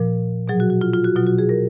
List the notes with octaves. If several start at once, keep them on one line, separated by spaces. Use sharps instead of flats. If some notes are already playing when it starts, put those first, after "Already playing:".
Already playing: A#2 F3 A#4
B2 F#3 G#4
F#4
F#4
F4
F4
F#4
B2 F#3 F4
F#4
G#4
A#4